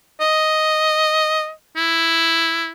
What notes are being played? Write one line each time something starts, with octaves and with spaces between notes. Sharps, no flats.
D#5
E4